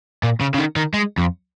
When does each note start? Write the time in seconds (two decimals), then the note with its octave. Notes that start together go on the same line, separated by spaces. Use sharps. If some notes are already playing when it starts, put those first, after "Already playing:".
0.23 A#2
0.41 C#3
0.54 C#3
0.58 D#3
0.76 D#3
0.94 G#3
1.18 F2